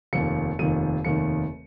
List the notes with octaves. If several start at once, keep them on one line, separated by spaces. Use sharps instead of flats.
F1 D#2 D#3 C#7
F1 D#2 D#3 D#7
F1 D#2 D#3 C#7